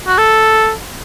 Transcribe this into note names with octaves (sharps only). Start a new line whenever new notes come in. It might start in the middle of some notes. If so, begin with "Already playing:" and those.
F#4
A4